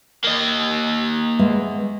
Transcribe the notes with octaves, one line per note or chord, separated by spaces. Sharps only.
A#3 D#5
G#3 B3 E5